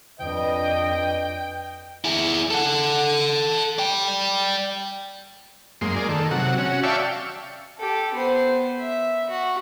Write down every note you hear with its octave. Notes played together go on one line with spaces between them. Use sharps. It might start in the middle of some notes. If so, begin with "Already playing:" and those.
F2 D4 B4 D#5 G5
E4 G#4
A4 F#5
D5 G5
F#2 G#3 A#3 C6
G#4 A#4 D5
D#3 A4
C3 F#3 F#5
C#4 F#4
D5 E5 F5 G5 A5 C#6
G4 A4
B3 C5
E5
F#4